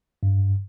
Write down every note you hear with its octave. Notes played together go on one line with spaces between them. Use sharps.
G2